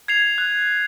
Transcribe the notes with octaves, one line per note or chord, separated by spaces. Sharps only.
G#6 C7 F7
F#6